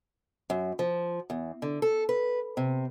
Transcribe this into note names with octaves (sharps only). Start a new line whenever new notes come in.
F#2
F3
E2
D3
A4
B4
C3